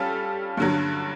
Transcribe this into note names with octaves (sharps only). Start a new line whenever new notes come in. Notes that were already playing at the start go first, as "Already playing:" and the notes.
Already playing: G3 C#4 F4 A4
G2 D3 F#3